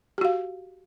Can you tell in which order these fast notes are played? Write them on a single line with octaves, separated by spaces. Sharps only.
G4 F#4 F5